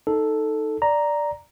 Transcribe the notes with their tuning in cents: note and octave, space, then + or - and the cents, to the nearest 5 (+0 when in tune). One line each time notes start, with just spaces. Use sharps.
D#4 +0 A4 +0
D5 +0 A#5 +0